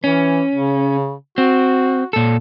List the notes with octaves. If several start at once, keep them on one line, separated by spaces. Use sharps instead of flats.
E3 C#4
C#3
C4 F#4
A#2 A4